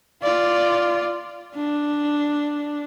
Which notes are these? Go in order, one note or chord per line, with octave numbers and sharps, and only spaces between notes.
F4 D5
D4